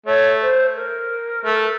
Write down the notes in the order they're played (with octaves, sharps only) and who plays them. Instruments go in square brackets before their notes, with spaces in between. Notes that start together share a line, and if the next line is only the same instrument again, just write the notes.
[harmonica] A3 [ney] C#5
[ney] C5
A#4
[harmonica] A3